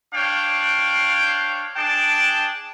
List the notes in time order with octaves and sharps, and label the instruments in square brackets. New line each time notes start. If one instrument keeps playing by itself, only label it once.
[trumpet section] D4 C#5 F5 G5
D4 G#4 G5 A5